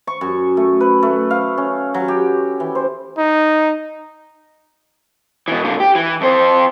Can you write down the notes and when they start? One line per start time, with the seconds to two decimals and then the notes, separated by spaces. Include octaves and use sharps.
0.07 C#6
0.21 F#2
0.57 A3
0.81 B4
1.03 A3
1.30 F5
1.58 C#4
1.94 F#3
2.08 G4
2.60 E3
2.75 C5
3.18 D#4
5.48 B2 E3
5.64 A#2 D3
5.80 G4
5.95 E3
6.21 F2 C5